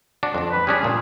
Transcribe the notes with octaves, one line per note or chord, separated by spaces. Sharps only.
D4 F#4
F2 D4
B4
G3 C#4 D4 G#4
A#2 C#3